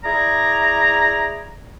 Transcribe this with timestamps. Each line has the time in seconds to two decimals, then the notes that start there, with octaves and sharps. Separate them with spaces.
0.05 E4 G#4 D5 A#5